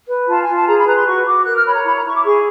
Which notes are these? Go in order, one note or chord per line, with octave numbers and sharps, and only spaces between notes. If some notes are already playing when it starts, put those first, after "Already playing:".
B4
F4 A5
G#5
F4
A5
G#4 A#5
B5
B4 A#5
C6
F#4 C#6
F#4 D6
A#4 F#6
F6
C#5 B5
A#5
E4 B5
A#5
E4 C#6
D6
G#4 C#6